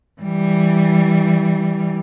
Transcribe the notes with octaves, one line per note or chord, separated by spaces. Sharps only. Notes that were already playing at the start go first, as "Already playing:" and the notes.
E3 G3